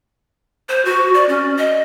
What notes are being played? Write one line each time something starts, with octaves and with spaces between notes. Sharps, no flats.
C5
F#4
D5
C#4
D#5